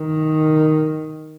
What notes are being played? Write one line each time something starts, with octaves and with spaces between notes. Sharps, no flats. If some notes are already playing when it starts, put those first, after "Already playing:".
Already playing: D#3